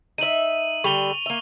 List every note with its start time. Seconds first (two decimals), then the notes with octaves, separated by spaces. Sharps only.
0.18 D#4 E5 D#7 F#7
0.84 D3 G3 C#6 F7 G7
1.26 A#3 E5